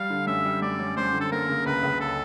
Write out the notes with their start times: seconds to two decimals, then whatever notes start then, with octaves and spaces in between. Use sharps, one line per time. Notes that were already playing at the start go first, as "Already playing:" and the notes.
Already playing: G3 F5
0.10 D3
0.27 F#2 E5
0.45 G3
0.62 F#2 D5
0.79 F#2
0.97 F#2 C5
1.13 D3
1.20 A4
1.31 A#3 A#4
1.48 C#3
1.66 C#2 B4
1.83 C#2
2.00 A4